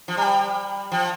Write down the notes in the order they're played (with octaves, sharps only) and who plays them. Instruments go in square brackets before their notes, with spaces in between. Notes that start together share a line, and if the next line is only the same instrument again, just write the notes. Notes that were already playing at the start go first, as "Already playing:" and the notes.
[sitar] F3
[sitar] G3 [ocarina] A#5
[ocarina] G5
[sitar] F3 [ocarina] G5